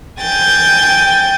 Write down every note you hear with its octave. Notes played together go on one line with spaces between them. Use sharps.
G5 G#5 G6 A6